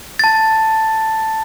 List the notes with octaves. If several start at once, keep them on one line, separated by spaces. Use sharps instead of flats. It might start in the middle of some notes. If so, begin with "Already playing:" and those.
A5 A6